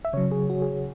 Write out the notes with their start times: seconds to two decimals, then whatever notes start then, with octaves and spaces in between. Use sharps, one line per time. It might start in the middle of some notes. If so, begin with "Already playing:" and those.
0.05 E5
0.13 C#3 F#3 C#5
0.32 G#4
0.50 F#4
0.62 G#4